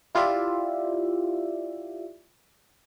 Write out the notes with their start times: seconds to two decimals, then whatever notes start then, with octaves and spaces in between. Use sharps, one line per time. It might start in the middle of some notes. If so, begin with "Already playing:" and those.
0.15 E4 F4 G4 D5 E5